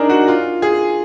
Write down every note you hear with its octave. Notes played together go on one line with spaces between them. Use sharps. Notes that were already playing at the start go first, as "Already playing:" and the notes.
Already playing: D4 D#4 G#4 A#4
F#4
F4
G#4